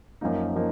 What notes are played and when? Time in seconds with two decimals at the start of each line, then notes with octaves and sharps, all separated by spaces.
0.21 F#2 F3 A#3 D#4
0.56 F3 A#3 D#4